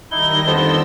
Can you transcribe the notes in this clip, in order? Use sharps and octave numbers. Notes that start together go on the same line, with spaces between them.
D#3 G3 D#4 E4 A#6 G7
F2 B3 D4 C5 A5 E6